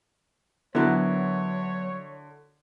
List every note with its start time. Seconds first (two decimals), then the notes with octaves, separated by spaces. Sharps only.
0.75 D3 F#3 B3 E4 F#4 A#4 C#5